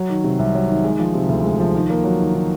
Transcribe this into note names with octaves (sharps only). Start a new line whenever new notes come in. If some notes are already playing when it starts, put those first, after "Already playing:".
Already playing: F#3
D#3
C3
C2
F#3
D#3
G#3
F3
C3
D2
G#3
F3
D#3
A#3
F#3
D#3
D#3